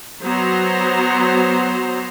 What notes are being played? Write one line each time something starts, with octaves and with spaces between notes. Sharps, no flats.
F#3 B3 C5 A#5